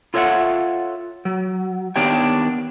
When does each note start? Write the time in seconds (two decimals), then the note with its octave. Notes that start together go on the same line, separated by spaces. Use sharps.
0.14 F4 A4 C#5 D#5 E5 F#5
1.25 F#3
1.96 D#3 B3 D4 G4 C#5 G5